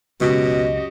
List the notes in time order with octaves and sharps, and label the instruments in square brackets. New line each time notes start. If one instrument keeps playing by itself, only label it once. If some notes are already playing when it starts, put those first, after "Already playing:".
[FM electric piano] C#2 [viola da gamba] F#2 F#4 G4 [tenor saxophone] B2 [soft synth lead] D#5